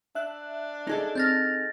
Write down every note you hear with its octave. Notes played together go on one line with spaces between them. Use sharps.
D4 E5 F#6
D#4 G#4 A4
C4 F6 G6 A6 A#6